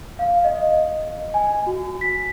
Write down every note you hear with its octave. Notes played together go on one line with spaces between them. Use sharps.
F5
D#5
G#5
F#4
B6